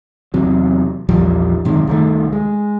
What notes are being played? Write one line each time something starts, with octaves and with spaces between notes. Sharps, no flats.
E2 C3 F#3
A#1 E2 F3 G3
F#2 C3 D#3 G#3
C2 D#3 A3
G#3